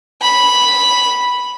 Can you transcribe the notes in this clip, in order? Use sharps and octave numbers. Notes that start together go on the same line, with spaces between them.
B5